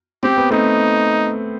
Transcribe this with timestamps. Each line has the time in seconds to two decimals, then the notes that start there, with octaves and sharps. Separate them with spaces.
0.23 C4 G4
0.37 B3
0.50 A3 C4 D#4